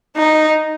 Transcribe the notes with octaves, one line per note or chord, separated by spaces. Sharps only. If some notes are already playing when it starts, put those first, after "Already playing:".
D#4